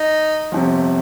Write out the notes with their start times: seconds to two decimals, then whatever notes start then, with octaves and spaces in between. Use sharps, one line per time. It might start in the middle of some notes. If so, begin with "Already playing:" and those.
Already playing: D#4
0.52 G1 F2 C3